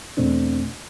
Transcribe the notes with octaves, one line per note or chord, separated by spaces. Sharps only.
E2 B2 A3 C4 D4